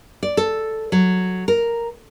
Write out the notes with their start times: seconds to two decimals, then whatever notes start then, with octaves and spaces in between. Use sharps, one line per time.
0.23 D5
0.37 A4
0.92 F#3
1.48 A#4